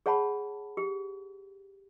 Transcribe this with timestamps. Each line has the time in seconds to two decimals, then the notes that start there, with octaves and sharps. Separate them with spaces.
0.06 G#4 C#5 F#5 A5 B5
0.77 G4